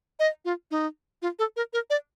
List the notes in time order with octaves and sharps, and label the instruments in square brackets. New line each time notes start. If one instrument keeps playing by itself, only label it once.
[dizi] D#5
F4
D#4
F4
A4
A#4
A#4
D5